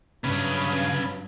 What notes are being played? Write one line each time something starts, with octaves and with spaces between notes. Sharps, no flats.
G2 C#3 F#3 C#4 B4